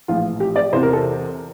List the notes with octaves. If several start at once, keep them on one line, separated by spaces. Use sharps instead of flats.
A#1 A2 E3 F4
G4
D5
E2 C3 E3 C5
A#4
A4